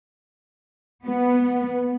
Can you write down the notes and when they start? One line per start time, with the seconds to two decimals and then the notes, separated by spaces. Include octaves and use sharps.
1.07 B3